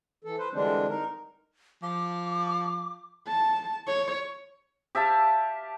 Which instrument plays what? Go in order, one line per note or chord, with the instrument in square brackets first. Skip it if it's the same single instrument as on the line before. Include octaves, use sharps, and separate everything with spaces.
[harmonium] E3 A4
B4 C5
D3 E3 G3 G#3 C4 D4
D#4 A#4
[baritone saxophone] F3 [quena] D6
[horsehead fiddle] A5
C#5
[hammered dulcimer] G4 E5 F5 A5